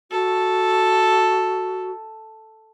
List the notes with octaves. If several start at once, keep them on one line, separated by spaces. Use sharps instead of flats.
F#4 A4